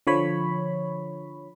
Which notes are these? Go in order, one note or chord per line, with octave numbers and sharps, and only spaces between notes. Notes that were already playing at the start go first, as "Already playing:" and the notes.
D3 F3 C#5 B5